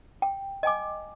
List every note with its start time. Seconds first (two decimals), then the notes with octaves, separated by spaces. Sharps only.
0.22 G5
0.63 D#5 G5 G#5 D6